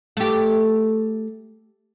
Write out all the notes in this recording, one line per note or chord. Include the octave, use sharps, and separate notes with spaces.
A3 G4